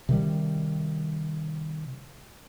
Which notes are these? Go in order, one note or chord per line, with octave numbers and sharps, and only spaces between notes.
C3 D#3 G3